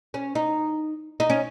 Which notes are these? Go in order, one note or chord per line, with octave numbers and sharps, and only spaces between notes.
C#4
D#4
D#4
C#4